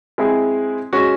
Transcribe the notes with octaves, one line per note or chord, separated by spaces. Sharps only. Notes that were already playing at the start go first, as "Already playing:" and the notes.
G#3 C4 E4 G#4
G#3 C#4 F#4